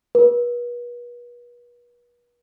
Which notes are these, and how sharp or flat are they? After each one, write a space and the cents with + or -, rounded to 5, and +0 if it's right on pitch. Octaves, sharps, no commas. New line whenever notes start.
B4 -40